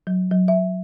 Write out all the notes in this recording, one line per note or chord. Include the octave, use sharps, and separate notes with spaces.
F#3
F#3
E5